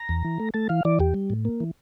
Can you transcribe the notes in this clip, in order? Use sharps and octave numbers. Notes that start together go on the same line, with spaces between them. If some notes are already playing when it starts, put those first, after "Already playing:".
Already playing: A#5
E2
E3
A3
A3 A5
E3 F5
E3 D5
E2 G4
G3
A2
A#3
E3